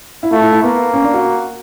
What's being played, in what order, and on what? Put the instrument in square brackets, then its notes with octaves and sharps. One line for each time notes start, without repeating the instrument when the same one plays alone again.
[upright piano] E4
[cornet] A3 [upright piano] F4
[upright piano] E4
E4
[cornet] A#3 [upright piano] B3
[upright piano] C#4
D4
F#4